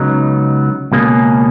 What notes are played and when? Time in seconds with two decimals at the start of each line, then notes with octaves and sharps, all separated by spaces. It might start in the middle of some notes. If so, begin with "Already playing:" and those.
Already playing: C#2 C#3 F#3 B3 D#4
0.92 C#2 B2 A#3 C#4 G#4